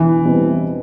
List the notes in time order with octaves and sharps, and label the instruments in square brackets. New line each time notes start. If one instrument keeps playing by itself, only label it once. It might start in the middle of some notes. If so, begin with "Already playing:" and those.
Already playing: [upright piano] E1 [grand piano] E3
[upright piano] B2 G3 C4